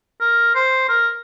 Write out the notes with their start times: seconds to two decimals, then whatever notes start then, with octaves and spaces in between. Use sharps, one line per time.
0.21 A#4
0.55 C5
0.89 A#4